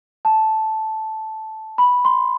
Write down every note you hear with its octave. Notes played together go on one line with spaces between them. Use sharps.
A5
B5
C6